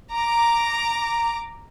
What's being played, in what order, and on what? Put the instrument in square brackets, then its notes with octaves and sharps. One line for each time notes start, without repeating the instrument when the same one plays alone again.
[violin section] A#5 D6